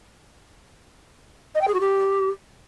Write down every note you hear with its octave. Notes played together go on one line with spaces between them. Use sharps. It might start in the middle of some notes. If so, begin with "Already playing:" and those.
D#5
G5
G#4
F#4
G4